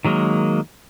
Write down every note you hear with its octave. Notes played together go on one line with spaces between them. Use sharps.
D#3 F#3 G#3 A#3